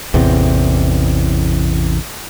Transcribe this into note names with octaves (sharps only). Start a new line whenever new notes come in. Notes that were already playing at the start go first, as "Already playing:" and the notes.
A1 E2 C3